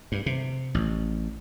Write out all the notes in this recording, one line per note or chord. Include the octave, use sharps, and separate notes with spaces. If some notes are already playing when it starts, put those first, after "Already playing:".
G2
C3
A1